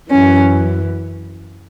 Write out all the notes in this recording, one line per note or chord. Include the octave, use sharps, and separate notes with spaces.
F#2 E3 C#4